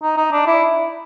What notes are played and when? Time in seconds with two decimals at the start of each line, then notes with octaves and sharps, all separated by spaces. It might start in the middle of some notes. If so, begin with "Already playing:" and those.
0.03 D#4
0.18 D#4
0.32 D4
0.47 E4